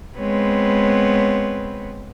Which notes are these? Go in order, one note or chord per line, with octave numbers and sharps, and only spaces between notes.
G#3 B3 C4 B4 C#5